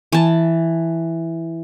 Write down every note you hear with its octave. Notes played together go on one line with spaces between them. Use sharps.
E3 A5